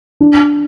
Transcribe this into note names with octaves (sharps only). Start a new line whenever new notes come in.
D4